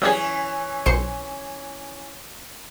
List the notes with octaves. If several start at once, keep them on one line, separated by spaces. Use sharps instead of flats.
E3 F#3 G3 C#4 G#4
B1 C5 C#7